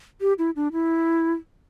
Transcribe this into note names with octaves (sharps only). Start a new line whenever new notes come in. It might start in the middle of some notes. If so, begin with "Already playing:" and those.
G4
E4
D4
E4